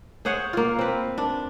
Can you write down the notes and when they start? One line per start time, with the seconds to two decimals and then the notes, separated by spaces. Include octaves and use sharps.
0.25 G#4 C5 C#5 F#5
0.53 A#3 F4
0.79 C4 B4
1.18 D4